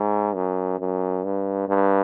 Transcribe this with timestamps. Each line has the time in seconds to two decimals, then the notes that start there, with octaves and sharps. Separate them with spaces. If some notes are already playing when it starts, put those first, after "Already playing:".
Already playing: G#2
0.35 F#2
0.80 F#2
1.24 G2
1.68 G2